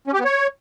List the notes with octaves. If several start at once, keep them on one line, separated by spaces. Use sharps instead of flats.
C#4
G4
B3
C#5